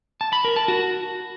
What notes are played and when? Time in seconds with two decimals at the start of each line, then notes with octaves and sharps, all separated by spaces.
0.21 A5
0.33 B5
0.45 A#4
0.56 A5
0.68 F#4